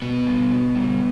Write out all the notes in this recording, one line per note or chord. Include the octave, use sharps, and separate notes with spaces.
B2 B3
G3
B2
G3